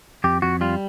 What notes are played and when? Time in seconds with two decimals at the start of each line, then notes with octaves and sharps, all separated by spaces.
0.24 F2 G4
0.42 F2 F#4
0.61 G3 F4